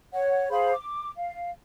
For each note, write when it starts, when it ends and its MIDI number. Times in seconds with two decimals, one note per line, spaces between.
0.12 0.47 73
0.12 0.47 78
0.49 0.72 68
0.49 0.72 72
0.49 0.72 77
0.49 0.72 83
0.73 1.12 86
1.15 1.50 77